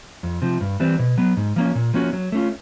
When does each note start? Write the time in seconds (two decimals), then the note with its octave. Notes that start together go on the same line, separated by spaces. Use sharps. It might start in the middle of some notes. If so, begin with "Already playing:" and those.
0.23 F2
0.42 C3 F3
0.61 G2
0.80 E3 G3 C4
0.99 B2
1.18 F#3 B3
1.37 G#2
1.56 F3 A#3 C#4
1.75 A#2
1.94 F3 A#3 C#4 F#4
2.13 F#3
2.32 A3 C#4 F4